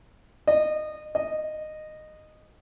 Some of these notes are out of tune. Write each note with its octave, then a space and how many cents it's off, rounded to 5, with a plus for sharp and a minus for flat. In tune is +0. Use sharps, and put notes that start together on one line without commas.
D#5 -25
D#5 -15